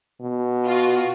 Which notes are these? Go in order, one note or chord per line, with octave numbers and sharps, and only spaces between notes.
B2
F4 F#4